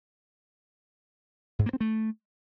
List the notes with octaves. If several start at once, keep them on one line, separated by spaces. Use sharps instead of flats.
G#2
A#3
C4
A3